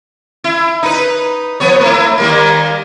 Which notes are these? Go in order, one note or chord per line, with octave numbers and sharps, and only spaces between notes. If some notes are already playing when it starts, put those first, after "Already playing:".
E4
D#4 B4
F3 B3 C#5
A3 E4
D#3 G3 A#3